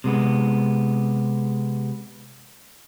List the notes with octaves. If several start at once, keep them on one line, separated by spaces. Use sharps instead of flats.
C3 G#3 B3